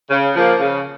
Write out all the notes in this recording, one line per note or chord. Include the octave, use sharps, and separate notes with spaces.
C#3
F3 A#3
C#3